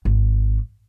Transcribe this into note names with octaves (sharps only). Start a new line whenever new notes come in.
G#1